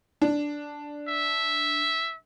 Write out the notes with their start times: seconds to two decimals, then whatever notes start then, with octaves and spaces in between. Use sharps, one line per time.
0.22 D4
1.08 E5